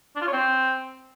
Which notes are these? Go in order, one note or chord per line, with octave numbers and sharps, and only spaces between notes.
D4
F4
C#5
C4